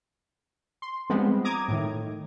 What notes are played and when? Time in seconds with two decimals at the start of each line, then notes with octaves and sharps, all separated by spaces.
0.82 C6
1.10 F3 G3 G#3 B3 C4
1.45 A#5 D6 D#6 G#6
1.68 A2 D#3